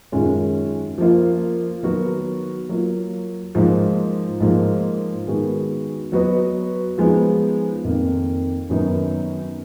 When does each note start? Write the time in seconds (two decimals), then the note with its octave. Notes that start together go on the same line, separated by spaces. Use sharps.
0.12 F#2 D#3 G#3 C#4 F4
0.98 F3 A#3 F4
1.83 D#3 F#3 B3 F#4 A#4
2.69 F#3 A#3 F4
3.55 G#2 F3 A#3
4.40 G#2 F3 A#3
5.27 D#3 G#3 B3 F#4
6.12 F#3 B3 F#4 B4 D#5
6.98 F3 G#3 B3 D#4
7.84 F2 D#3 A#3
8.70 F#2 D#3 F#3 B3 D#4